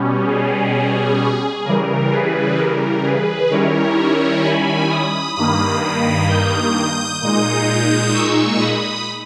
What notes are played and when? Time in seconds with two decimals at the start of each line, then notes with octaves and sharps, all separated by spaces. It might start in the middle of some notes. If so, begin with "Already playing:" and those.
Already playing: B2 G3 C#4
0.26 G#4
1.65 C#3 E3 G3 A#4
2.11 G#4 B4
2.58 A#4
3.04 G#4 B4
3.50 D#3 G3 C#4 E4 A#4 C#5
4.43 G#5 B5
4.90 B5 D#6
5.36 G2 D#3 A#3 B5 D#6
5.82 B5 D#6
6.29 D#6 G6
7.21 A#2 G#3 D#4 D#6 G6
8.14 C#6 E6
8.61 B5 D#6